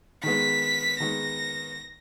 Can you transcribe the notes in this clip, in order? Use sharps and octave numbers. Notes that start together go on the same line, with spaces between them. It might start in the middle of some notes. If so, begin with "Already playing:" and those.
D#3 G#3 B3 B6
D#3 G#3 B3 A#6